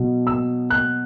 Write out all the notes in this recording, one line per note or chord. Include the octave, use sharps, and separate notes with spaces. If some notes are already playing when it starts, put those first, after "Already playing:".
Already playing: B2 F#3
E6
F#6